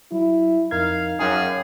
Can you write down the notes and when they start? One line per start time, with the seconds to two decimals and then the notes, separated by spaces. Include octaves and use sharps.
0.12 F#3 E4
0.71 F2 D#4 A#4 F5 G#6
1.20 F#2 G#4 F5 G5 G#5